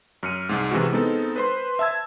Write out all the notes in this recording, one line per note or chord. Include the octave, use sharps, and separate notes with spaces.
F#2 F6 C#7 D#7
C2 G#2
C3 E3 G#3 F#4
G#3 B3 C4 D#4 A4
B4 C5 C6
E5 A5 E6 G#6